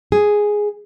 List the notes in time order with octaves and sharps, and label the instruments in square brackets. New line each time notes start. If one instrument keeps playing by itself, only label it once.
[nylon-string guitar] G#4